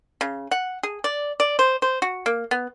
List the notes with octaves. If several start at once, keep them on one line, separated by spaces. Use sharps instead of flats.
C#3
F#5
G#4
D5
D5
C5
C5
F#4
A#3
B3